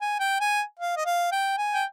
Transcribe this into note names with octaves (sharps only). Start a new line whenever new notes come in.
G#5
G5
G#5
F5
D#5
F5
G5
G#5
G5